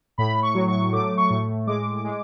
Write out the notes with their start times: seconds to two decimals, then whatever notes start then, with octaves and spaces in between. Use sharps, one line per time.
0.18 A2 B5
0.42 C#6
0.55 F#3
0.68 C#6
0.92 A3 D6
1.17 C#6
1.30 A2
1.67 G#3 D6
2.04 G#3